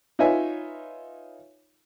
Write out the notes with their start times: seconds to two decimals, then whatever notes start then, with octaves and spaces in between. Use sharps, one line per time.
0.19 D#4 F4 B4 C#5 E5 G#5